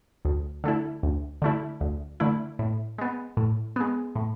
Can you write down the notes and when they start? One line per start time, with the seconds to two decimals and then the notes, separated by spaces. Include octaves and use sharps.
0.25 D2
0.64 D3 A3 E4
1.03 D2
1.42 D3 A3 E4
1.81 D2
2.20 D3 A3 E4
2.59 A2
2.98 G#3 B3
3.37 A2
3.76 G#3 B3
4.15 A2